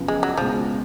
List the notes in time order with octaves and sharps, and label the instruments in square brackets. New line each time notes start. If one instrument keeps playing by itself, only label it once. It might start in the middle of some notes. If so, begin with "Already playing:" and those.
Already playing: [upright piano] F#2 C#3 F3 B3
[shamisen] G#3
F#3
[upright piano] C#2 B2 G#3 [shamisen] F3